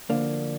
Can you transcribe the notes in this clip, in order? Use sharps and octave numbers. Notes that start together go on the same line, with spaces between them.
D2 D3 F3 A#3 D4